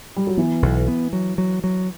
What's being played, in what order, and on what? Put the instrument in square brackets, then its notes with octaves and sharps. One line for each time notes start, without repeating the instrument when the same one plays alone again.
[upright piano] G3
F#3
[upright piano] E3 [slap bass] B3
[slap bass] B1
B3
F#3
F#3
F#3